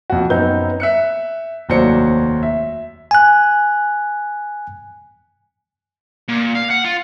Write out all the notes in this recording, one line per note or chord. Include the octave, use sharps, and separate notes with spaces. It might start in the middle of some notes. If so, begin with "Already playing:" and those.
F2 F#4
F#2 B3 C4 D#4 A#5 G6
E5 F#6 C#7
F1 D#2 F#3 C5 D5 C#7
E5
G#5 F#6
A#2
F5
F#5
F4